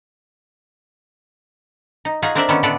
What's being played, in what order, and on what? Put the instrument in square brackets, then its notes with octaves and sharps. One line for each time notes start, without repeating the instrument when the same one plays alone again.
[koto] D#4
D#4 F4 F#4 G#4 F#5
C4 D4 A#4 C5 D5 E5
D3 D#3 G3 B3 C#4 A4
A2 D3 B3 D4 A4 D5